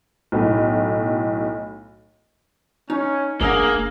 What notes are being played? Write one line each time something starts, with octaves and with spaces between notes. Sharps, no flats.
B1 A2
C#4 D#4
F#1 A#3 D4 G#4 E5 F#5